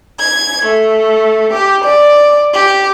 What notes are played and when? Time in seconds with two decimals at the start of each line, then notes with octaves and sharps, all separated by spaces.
0.20 G#6
0.65 A3
1.52 G4
1.84 D5
2.54 G4